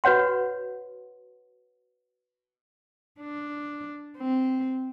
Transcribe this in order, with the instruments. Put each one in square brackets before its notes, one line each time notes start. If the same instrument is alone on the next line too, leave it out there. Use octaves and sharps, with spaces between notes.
[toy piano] F#4 B4 C#5 F#5 C6
[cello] D4
C4